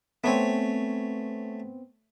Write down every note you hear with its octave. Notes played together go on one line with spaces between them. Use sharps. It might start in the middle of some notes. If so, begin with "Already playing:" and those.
A3 B3 C4 C#5 G#5